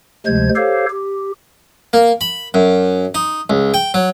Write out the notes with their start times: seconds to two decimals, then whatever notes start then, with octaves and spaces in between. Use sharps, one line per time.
0.26 D2 C3 F3 G#3 C5 G#6
0.56 G4 A4 C5 C#5 F5
0.90 G4
1.93 A#3
2.21 B5
2.54 F#2
3.15 D#4
3.50 C#2
3.74 G5
3.94 F#3